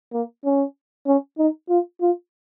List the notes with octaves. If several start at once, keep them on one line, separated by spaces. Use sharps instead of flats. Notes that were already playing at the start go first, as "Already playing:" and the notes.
A#3
C#4
C#4
D#4
F4
F4